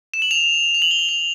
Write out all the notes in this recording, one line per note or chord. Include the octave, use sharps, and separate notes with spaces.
E7
F#7
F7
F7
F#7
G7
F#7
F7